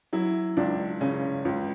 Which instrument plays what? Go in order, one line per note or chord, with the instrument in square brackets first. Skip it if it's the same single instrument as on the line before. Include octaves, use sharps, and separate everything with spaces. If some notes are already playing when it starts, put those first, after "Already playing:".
[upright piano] F#3 E4
C#2 D4
C#3 C#4
C#2